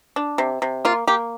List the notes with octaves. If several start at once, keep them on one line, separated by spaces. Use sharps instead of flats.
D4
C3
C3
A#3 F4
A#3 G4